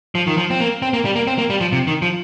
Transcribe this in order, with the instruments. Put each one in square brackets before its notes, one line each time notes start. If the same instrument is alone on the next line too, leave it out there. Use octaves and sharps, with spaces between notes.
[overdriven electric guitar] F3
D#3
F3
C4
A#3
C4
A#3
G3
A#3
C4
A#3
G3
F3
C3
D#3
F3